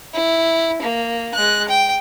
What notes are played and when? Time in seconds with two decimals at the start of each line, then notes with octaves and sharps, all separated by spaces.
0.14 E4
0.82 A#3
1.34 G#3 F#6
1.69 G5